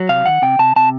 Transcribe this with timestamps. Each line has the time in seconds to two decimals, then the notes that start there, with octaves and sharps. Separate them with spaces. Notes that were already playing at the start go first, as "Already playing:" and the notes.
Already playing: F#3
0.09 C3 F5
0.26 D#3 F#5
0.42 C3 G5
0.59 C3 A5
0.76 C3 A5